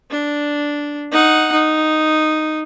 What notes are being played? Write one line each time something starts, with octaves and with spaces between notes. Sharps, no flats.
D4
D#4 F#5
D#4